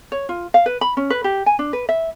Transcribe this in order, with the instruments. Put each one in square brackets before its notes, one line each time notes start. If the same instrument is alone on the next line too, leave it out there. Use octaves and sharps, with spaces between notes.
[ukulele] C#5
F4
F5
B4
B5
C#4
B4
G4
G#5
D4
B4
E5